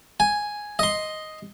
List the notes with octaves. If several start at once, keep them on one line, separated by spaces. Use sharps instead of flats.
G#5
D#5 C6